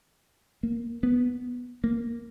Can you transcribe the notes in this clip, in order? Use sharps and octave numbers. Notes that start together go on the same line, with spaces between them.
A#3
B3
A#3